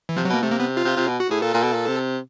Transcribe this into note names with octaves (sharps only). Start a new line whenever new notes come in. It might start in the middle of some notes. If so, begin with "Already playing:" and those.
E3
C3 F3
F#3
B2 A#3
C3 A3
A#3
B3
F4
C3
C3
B2
F#4
A2 G#4
A#2 A4
A#2
B2
A#2
C3